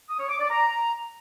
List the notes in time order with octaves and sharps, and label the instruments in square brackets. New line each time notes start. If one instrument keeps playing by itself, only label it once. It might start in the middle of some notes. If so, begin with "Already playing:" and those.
[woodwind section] D#6
C#5
D6
D5
A#5